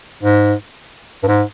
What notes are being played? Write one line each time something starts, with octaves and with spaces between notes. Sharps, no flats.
G#2
G2
G#2